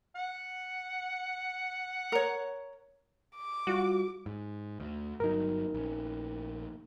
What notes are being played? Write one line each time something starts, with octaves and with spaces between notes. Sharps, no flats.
F#5
A#4 C#5
D6
G3 F4 F#4
G#2
D2
G1 F#3 D#4 A#4
A#1 C#4